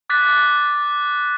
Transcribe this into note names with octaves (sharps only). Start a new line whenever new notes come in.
D6 F#6 A6 B6